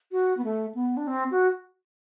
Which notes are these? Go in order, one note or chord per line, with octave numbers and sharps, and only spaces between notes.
F#4
B3
A3
B3
D4
C4
F#4